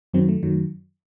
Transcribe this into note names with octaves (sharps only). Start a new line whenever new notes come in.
F#2 D#3 F#3 C4
A3
F#2 D#3 F#3